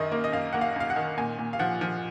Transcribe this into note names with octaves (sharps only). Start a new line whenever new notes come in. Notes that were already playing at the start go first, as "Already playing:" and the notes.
Already playing: F#2 D#3 D#5
A#3
D#5
F#2 F5
A#3 F#5
F5
F#2 F5
F#5
D#3
A#2 G#5
A#2
F5
F3 F#5
F3